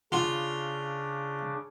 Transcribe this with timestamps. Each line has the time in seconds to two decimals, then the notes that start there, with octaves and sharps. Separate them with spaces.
0.12 C#3 D4 F4